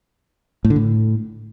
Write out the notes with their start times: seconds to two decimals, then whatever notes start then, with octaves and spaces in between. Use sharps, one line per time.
0.65 A2
0.70 D3
0.76 A2